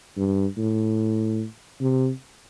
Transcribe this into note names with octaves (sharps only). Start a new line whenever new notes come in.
G2
A2
C3